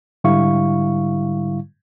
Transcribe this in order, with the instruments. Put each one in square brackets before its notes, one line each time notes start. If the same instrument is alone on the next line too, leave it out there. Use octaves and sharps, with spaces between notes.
[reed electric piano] G#2 D3 G3 E4 F5 C#6